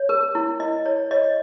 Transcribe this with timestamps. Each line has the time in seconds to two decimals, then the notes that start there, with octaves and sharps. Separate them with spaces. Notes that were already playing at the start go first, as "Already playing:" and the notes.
Already playing: C#5
0.09 A#4
0.35 E4
0.60 E4 D#5
0.86 C#5
1.11 C#5 D#5